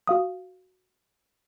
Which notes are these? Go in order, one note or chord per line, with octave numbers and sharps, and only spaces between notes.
F#4 F5 D#6